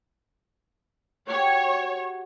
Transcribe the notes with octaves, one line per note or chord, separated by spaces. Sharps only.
F#4 G4 C#5